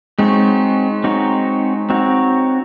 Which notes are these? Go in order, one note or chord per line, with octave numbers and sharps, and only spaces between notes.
G#3 C4 D#4 F#4 C#5
C4 D#4 F#4 C#5
C4 D#4 F#4 C#5